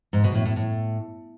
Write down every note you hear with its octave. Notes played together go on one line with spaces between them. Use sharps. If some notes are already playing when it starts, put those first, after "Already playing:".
G#2
B2
A2
A2
A2